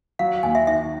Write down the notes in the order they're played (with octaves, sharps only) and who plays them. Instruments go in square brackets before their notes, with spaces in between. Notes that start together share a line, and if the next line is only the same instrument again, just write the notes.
[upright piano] F#3 [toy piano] F5
[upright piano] D#2 [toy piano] G#5
[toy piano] E5
[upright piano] D#3 [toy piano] E5